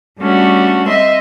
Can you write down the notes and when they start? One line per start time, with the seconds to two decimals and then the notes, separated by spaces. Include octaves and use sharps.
0.19 G3 A3 C#4 D4 F#4
0.87 C4 D#5 E5 C6